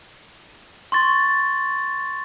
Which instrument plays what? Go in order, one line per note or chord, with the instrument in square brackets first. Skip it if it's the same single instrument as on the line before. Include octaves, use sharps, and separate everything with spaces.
[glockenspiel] C6 C#6 A6